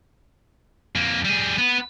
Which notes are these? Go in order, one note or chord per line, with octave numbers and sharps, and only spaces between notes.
F2 A#3
G3 G#4
B3 B4